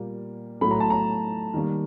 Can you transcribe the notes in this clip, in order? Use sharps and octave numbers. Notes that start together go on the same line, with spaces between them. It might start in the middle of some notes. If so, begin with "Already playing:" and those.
Already playing: A#2 G3 A#3
A2 F#3 A3 B5
A#5
A5
A#5
D#3 G3 A#3